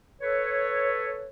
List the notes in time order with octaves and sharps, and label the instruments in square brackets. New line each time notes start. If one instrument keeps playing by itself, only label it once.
[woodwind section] A4 B4 C#5